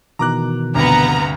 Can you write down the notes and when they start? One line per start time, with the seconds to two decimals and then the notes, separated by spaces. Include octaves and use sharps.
0.19 B2 D#3 E3 A#5 D6 F#6
0.74 D2 G2 C3 B3 A#5